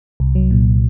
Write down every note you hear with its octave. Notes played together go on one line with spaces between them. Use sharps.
C2
F#3
A#2